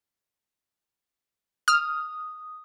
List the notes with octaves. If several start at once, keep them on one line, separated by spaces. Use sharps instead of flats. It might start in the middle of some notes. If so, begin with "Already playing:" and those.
D#6 F6